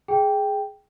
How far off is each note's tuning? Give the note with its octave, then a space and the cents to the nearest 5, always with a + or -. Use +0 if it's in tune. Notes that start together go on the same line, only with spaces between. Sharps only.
G#4 +5 G5 +0